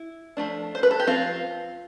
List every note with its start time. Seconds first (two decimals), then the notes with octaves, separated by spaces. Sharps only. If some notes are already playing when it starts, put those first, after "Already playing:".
Already playing: E4
0.37 F3 A3 D4
0.75 C5
0.83 B4
0.91 A4
1.00 G4
1.07 F3 C4 F4